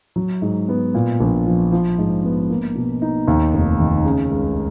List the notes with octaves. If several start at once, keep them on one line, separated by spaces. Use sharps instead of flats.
F#3
G#2
B3
A#2
A#1
F3
F3
G#2
B3
A#3
B2
D#4
D#2
F1
D#3
C#3
C#2